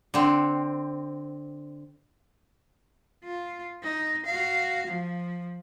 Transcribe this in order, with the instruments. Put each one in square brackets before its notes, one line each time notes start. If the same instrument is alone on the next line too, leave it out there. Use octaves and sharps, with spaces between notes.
[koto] D3 C4
[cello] F4
D#4
F#4 F5
F3